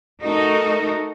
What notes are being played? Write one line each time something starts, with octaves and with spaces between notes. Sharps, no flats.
A3 D#4 F#4 A4 A#4